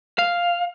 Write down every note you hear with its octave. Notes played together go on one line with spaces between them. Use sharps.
F5